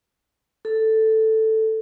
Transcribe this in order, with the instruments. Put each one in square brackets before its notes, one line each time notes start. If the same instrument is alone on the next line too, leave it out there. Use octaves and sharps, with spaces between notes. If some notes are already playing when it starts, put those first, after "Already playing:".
[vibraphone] A4